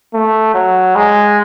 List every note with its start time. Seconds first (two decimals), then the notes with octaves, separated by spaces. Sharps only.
0.14 A3
0.54 F#3
0.96 G#3